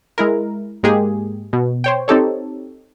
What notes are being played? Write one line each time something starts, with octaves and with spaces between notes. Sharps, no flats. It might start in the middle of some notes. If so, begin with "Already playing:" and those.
G#3 E4 A#4
G#2 G#3 A#3 G4 G#4
B2
C5 C#5 G5
C4 D#4 G4 A4 C#5